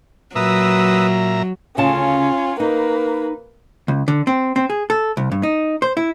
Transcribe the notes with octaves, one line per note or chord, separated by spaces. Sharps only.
A#2 F#3 B4 E5 A#5 D#6 E6
D2 C#3 C#4 F4 A5
A#3 D#4 B4
C#2
D3
C4
C4
G#4
A4
C2
G2
D#4
C5
E4